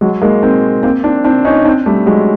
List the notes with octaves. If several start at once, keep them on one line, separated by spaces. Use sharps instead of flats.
F#3 G#3
G#3 A#3
A#3 C4
A#3 C4
C4 D4
C4 D4
C#4 D#4
C4 D4
G3 A3
F#3 G#3